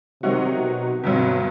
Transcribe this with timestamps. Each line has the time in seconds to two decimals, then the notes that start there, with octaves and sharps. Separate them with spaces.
0.23 C3 D#3 F#3 C4 D#4 F#4
0.63 B2
1.03 G1 G2 B2 F#3 C4